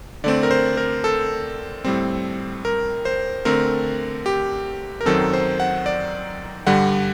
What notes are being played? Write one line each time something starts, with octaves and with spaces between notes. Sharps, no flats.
D3 A3 C4 D5
A#4
C5
A#4
A4
A2 G3 C4
A#4
C5
D3 A3 C4 A#4
G4
A#4
F#2 D#3 F#3 C4 A4
C5
F#5
D5
G2 D3 G3 F#5